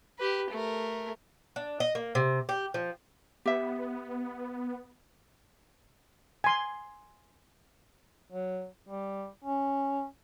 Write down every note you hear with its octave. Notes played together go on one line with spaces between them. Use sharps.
G4 B4
A3 A#4
D4
D#5
A#3
C3
G4
F3
B3 G4 E5
G#5 C6
F#3
G3
C#4